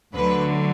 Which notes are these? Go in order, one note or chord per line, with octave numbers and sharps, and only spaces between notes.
D2 D3 F#3 B4